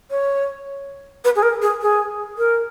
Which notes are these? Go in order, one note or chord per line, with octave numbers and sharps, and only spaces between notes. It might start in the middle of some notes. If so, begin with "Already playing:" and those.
C#5
B4
G#4
A#4
G#4
G#4
A#4